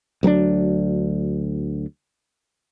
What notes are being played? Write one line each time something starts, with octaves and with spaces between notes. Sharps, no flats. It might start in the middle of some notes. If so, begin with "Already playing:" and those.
D2 F#3 C4 D4